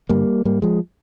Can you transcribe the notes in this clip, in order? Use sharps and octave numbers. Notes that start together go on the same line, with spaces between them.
G2 D3 G3 A#3
G#2 G3 A#3
F3 G#3